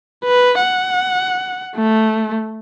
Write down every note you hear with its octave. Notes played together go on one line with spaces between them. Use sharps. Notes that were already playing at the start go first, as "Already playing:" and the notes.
B4
F#5
A3